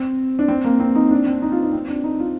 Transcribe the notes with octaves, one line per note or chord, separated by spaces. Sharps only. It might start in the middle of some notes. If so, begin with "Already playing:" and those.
Already playing: C4
D4
C4
A#3
C4
D#4
D4
C4
D#4
F4
D#4
C4
D4
D#4
F4